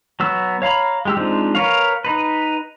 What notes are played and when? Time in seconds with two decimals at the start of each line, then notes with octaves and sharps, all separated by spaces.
0.20 F#3 B3 E6
0.62 C#5 F5 A#5 B5
1.05 G#3 G4 E6
1.17 F3 G#3 C4 D4 D#4
1.55 A#4 B4 C#5 F5
2.05 D#4 B4